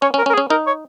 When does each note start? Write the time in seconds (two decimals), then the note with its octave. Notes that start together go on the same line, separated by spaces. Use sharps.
0.02 C#4 C#5
0.14 C#4
0.18 A#4
0.26 C#4
0.29 A#4
0.34 G#4
0.38 C#4
0.50 D#4 A#4
0.67 C#5